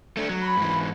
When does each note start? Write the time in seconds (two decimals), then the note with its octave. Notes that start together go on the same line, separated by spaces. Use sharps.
0.17 A3 D4
0.29 F#3
0.41 B5
0.57 G#2 E3